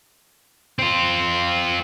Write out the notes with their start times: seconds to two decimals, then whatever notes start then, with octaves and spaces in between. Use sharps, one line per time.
0.79 C4 F4